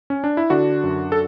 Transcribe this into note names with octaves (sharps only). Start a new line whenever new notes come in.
C#4
D4
E4
D3 D4 F#4
F#2
A4